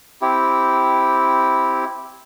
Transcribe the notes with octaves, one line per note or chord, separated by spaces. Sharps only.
C4 E4 G4